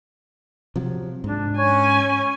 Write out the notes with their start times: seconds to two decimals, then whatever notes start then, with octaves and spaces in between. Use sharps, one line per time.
0.76 C3 F3 F#3
1.24 G#2 D4
1.58 C#4 C#5 G#5